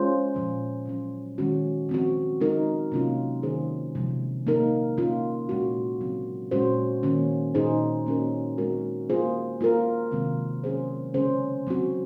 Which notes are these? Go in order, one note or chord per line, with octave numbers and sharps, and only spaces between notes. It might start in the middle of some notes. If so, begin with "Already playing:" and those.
Already playing: G#3 C#4 F4 G#4 C5
A#2 F3 G#3
A#2 F#3 C#4
D#3 G#3 C#4 F#4
F3 C4 F#4
G#3 D#4 A#4
C3 F#3 A#3 C#4 F4
D#3 A#3 D#4 G#4 C5
C3 F3 G#3
A#3 D#4 A#4
A#3 C#4 F4
A#2 G#3 C#4 F#4
C#3 F#3 C4
A#2 G#3 C#4 F#4 C5
D#3 A#3 C#4
A#2 G#3 D#4 G#4 C5
A#3 C#4 F#4 A#4
G#3 C4 F#4 A#4
A#3 F4 G#4 C5
A#3 F4 A#4
C3 D#3 G#3 C4
F#3 C#4 G#4 C5
C#3 G#3 C#4 G#4 C5
F#3 C4 F#4